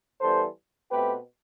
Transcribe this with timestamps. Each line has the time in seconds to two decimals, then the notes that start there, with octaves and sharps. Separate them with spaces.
0.20 E3 G3 B3 A4 C5
0.91 B2 A3 C4 G4 B4